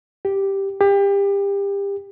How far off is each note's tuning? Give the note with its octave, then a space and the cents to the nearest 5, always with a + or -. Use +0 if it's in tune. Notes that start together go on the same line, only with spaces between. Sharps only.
G4 +0
G4 +30